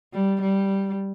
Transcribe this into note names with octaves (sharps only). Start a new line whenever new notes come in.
G3
G3